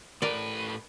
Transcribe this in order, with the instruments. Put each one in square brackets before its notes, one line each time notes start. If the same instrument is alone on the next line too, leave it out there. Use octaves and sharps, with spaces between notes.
[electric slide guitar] A2 B4 [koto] A#4 D5